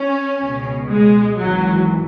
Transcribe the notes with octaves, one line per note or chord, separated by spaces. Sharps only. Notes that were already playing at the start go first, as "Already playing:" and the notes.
Already playing: C#4
C#2 B2
G#3
G#1 G#2 E3 F#3